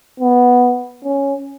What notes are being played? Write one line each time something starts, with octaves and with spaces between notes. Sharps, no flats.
B3
C#4